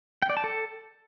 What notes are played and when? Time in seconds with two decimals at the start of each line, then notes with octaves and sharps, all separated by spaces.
0.22 G5
0.30 D5
0.37 A5
0.44 A4